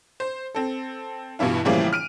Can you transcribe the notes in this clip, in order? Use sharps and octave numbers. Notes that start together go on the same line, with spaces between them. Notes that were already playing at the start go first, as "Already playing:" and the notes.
C5
C4 A4
G2 B2 E3 E4 F4
A2 C#3 E3 F3 G3 A#3
F6 D7 D#7